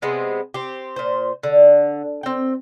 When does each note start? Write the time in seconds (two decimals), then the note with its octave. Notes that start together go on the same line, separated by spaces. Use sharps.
0.02 C3 G#3 B3 C4
0.54 C4 G4
0.96 A#2 C5
1.43 D3
2.23 C4 G5